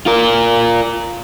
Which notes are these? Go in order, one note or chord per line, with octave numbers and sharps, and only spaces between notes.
F4 A#4